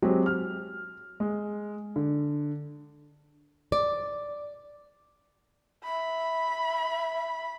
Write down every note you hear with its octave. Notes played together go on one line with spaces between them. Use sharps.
F#3 G#3 C4 F#4 G4
F6
G#3
D3
D5
E5 B5